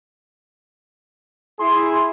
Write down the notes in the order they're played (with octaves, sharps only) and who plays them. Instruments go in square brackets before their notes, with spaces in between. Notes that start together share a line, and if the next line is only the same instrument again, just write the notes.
[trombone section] E4 G#4 [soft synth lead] C6